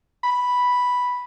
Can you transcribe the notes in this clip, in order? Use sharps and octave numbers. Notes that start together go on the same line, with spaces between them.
B5